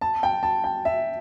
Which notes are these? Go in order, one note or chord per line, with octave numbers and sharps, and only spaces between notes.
A5
G5
A5
G5
E5